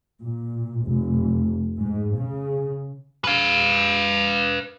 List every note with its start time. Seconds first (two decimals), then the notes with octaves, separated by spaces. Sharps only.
0.21 A#2
0.86 F1
1.78 G#2
2.17 C#3
3.24 B4 F5